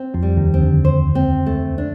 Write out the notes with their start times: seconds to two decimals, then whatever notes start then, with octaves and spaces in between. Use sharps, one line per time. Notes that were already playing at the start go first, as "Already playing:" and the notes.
Already playing: C4
0.14 F2 F3
0.22 G3
0.37 D#2 D#3
0.54 C4
0.60 D2 D3
0.85 C5
1.15 C4
1.46 A3
1.78 D4